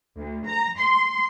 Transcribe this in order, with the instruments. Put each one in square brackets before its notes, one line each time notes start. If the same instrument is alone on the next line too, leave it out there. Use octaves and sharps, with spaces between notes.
[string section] D2
A#5
C6